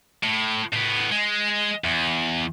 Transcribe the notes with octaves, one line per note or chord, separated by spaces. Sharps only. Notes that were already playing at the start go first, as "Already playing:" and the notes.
A2
A2 B3
G#3
E2